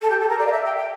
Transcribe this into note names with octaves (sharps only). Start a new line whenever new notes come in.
A4
G4
A4
A#4
D5
F5
E5
G5
G5